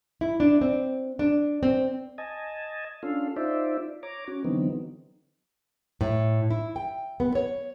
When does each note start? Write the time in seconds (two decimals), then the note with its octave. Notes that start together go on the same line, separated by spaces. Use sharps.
0.21 E4
0.40 D4
0.61 C4
1.19 D4
1.63 C4
2.18 D#5 G#5 A5
3.03 C#4 D4 F4 A4 F5
3.36 D#4 F4 C5 D5 E5
4.03 C#5 A#5 D6
4.27 C#4 F#4
4.45 D3 E3 F#3 B3 C4 D#4
6.01 A2
6.51 E4
6.76 G5
7.20 B3
7.35 C#5